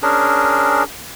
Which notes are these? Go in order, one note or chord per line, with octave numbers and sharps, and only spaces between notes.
C#4 D4 G#4 A#4